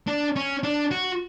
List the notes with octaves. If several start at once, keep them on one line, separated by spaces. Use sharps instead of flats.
D4
C#4
D4
F#4